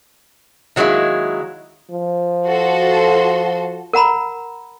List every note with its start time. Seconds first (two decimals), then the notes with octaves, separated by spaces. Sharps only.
0.76 D#3 F#3 G#3 A#3 E4
1.91 F3
2.46 F#4 A4 C6
3.93 A#4 F#5 A#5 B5